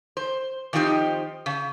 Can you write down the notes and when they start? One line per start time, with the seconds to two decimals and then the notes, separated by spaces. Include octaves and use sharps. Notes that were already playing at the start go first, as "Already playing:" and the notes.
0.17 C5
0.73 D#3 F3 C4 D#4 G4
1.46 C#3